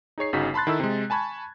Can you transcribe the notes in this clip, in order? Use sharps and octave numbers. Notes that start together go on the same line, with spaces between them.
D#4 G#4 C#5 C7
G1 C#3 D#4 F#4 B6
A5 B5 C6 F#6 A6
D#3 E4 A4 E6
C3 G#3
G#5 A5 B5 C#6 G#6